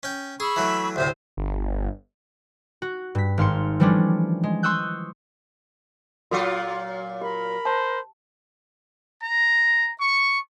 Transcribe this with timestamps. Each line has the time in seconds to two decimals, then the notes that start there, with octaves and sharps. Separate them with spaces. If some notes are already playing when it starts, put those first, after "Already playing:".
0.03 C#4 G5
0.40 G#4 B5 C#6 E6
0.56 E3 F#3 A3
0.96 D2 A2 C3 G4 C5
1.37 G1
2.82 F#4
3.15 G2 B6
3.38 G#1 F5 C6 C#7
3.80 E3 F3 G3 A3 C#4 D4
4.43 G#3
4.63 C6 C#6 D#6 E6 F#6 G6
6.31 A#2 F#3 F4 F#4 A4
7.21 G4 A#4 B5
7.65 C5 A5
9.22 A#5
9.99 C#6